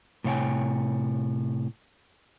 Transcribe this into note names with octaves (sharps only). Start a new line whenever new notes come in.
A2 C3 C#5 F5 G5 G#5